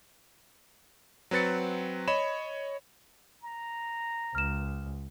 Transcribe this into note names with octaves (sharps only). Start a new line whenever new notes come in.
F#3 C4 B4 A6 C#7
C#5 D#5 B5 E7
A#5
C#2 F6 E7